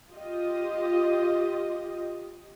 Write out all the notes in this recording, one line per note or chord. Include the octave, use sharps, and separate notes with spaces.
F4 G4 D#5